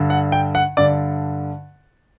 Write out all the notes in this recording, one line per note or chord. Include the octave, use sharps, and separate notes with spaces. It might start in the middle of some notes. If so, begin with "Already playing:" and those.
Already playing: G2 D3
F#5
G5
F#5
G2 D3 D5